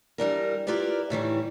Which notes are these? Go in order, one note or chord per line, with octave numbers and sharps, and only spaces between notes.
E3 G3 D4 A#4
E4 F4 G4 A#4 B4 D5
A2 D#3 E3 G3